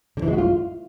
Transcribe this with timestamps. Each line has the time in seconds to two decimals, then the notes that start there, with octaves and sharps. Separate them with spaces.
0.17 D3
0.22 E3
0.28 G#3
0.33 F#4
0.38 F4